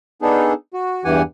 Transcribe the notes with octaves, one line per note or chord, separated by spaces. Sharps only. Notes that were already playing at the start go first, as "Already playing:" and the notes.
B3 D4 D#4 G#4 A4
F#4
E2 G2 E3 G4 F#5 G#5